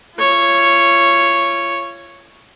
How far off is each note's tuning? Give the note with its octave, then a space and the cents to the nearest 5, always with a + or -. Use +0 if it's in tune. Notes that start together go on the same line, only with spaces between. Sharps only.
F4 -35 C#5 +0